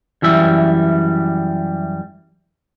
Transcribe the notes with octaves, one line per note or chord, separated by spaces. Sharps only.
F#2 E3 G3 E5